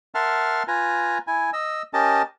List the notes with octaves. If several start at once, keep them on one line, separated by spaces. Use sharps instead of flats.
A#4 E5 F#5 A5 C6 F6
F4 B4 G#5 A#5
E4 G#5
D#5 E6
C#4 G4 A#4 D#5 A5